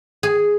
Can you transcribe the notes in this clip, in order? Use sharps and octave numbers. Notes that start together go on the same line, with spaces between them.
G#4